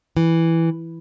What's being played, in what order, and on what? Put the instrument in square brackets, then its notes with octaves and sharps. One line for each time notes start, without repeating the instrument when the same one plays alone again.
[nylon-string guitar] E3